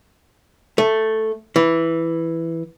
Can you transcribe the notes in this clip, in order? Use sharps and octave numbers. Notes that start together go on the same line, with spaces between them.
A3
E3